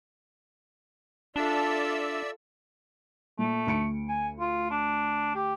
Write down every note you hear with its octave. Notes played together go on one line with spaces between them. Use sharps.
D4 F4 A4 D5 E5 E6
A#2 A3
D2 C#7 D7
G#5
F4
D4
G4